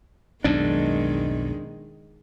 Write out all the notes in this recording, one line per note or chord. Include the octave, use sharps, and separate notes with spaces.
B1 F2 G#2 D#3 G#3 D4